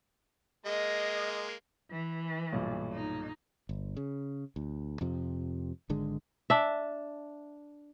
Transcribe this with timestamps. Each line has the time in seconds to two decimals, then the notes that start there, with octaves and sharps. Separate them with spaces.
0.66 G#3 A#3 D#5
1.91 E3
2.52 B1 G2 A#2
2.93 D#4
3.69 G1
3.97 C#3
4.56 D2
5.01 F2 C3 F3
5.90 G#1 D3 G#3
6.50 D4 E5